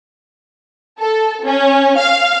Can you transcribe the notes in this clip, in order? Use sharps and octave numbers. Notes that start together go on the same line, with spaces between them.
A4
C#4
F5